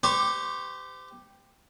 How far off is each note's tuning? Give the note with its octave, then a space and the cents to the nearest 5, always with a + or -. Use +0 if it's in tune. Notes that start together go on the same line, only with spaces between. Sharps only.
G4 +5 C5 -40 C#6 -20